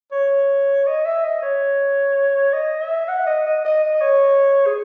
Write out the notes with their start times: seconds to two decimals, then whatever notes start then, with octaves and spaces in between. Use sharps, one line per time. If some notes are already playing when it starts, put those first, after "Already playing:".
0.12 C#5
0.87 D#5
1.05 E5
1.24 D#5
1.42 C#5
2.54 D#5
2.81 E5
3.09 F#5
3.27 D#5
3.46 D#5
3.65 D#5
3.83 D#5
4.01 C#5
4.66 G#4